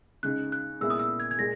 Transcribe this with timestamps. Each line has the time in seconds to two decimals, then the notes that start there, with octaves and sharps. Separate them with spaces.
0.23 C#3 G#3 D#4 F#6
0.52 F#6
0.81 A#2 G#3 B3 E4 E6
0.90 D#6
0.99 E6
1.20 G#6
1.31 G#6
1.38 A#2 G#3 A#6